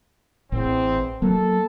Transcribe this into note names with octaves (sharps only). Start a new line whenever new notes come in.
A1 E2 C4
F#3 A#3 A4